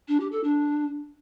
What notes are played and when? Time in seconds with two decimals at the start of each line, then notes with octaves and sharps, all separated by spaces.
0.08 D4
0.20 G4
0.32 A4
0.44 D4